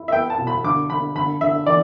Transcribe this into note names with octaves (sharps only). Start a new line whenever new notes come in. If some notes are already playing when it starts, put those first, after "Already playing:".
Already playing: E4
E5
B3 G5
A5
B2
B5
D3 D6
D3 B5
D3 B5
D3 E5
E3 D5